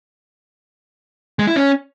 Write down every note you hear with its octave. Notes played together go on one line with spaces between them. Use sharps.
G#3
E4
C#4